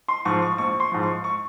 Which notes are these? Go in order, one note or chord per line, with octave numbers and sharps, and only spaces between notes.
C6
G#2 F3 C#6
C#6
A#1 C#6
C6
G#2 F3
C#6
C#6